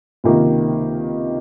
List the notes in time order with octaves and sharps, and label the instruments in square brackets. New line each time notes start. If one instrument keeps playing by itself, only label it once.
[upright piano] C#2 C3 D#3 A#3 D#4